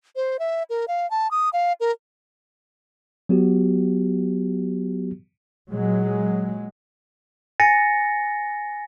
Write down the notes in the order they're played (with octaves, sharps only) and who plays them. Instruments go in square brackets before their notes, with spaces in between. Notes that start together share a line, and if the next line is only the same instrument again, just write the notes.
[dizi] C5
E5
A#4
F5
A5
D#6
F5
A#4
[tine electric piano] F#3 B3 F#4 G4
[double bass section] A#2 F#3 G#3
[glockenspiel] G#5 A6 A#6 C#7